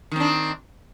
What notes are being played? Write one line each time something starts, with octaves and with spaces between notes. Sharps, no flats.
D#3 C4 D4